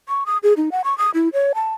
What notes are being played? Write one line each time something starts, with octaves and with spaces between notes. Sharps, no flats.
C#6
D#6
G#4
D#4
F#5
C#6
D#6
E4
C#5
A5